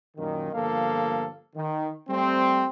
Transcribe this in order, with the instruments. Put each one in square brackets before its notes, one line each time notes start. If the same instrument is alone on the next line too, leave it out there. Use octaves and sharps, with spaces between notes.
[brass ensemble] F#2 A#2 D#3
G1 F3 A#3 A4 F5
D#3
G3 A3 C4